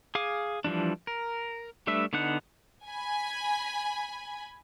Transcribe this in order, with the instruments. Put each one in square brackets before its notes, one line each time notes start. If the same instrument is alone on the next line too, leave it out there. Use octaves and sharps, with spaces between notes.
[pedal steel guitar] G#4 F5 G#5 D6
E3 F3 G3 D4
A#4
G3 A3 D4 B4 E5
D3 B3 D4 D#4 F#5
[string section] G#5 B5